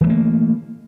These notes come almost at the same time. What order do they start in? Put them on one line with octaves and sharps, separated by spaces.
E3 F#3 A3 A#3